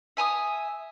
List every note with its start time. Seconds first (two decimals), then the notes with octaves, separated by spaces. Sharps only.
0.17 E5 G#5 A#5 D#6